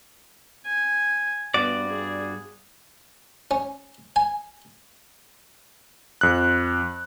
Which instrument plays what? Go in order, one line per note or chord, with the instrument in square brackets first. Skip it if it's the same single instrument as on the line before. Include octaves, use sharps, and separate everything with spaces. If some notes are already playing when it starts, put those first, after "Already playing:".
[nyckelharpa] G#5
[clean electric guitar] G2 F#4 D5 [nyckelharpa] B3
[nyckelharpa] G#4
[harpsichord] C#4
G#5
[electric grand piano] F2 F#6